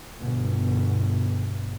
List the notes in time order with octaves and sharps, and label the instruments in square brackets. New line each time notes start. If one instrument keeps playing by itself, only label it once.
[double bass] G1 B2